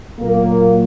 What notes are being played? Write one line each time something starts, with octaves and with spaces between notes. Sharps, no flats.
A#2 F#3 A#3